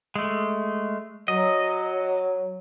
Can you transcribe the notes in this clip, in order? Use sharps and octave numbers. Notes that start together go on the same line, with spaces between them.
G#3 A3
F#3 D#5